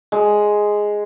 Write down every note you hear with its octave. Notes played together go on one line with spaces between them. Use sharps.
G#3